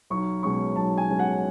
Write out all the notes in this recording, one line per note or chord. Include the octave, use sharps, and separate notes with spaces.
B1 C#6
B2 G#3 C#4 C#6
B1 A5
G#5
B2 G#3 C#4
F#5